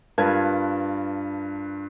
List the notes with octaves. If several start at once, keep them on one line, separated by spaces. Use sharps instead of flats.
G2 F4 A#4 B4 A5 G#6